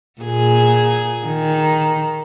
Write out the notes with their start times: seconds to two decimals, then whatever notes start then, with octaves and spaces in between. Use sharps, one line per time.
0.21 A#2 G#4
1.27 D#3